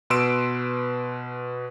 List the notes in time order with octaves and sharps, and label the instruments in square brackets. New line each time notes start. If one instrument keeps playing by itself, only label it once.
[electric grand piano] B2 B4 C6 E6 D7 E7